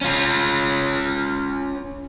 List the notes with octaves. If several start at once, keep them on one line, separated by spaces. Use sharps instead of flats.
C#4 F4